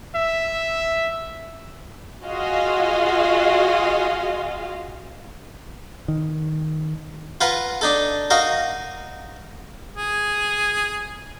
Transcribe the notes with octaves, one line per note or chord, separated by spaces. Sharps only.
E5
F4 F#4 G#4 D#5 F5
D#3
F4 B4 F5 F#5 A#5
D4 D#4 A4
D#4 F#4 A#4 D#5 F5
G#4